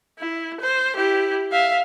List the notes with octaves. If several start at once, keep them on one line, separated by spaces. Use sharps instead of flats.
E4
C5
E4 G4
E5 F5